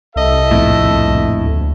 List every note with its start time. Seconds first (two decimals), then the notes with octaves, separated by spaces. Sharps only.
0.16 C2 A4 D#5 E5
0.51 A#1 F2 A2
1.43 D2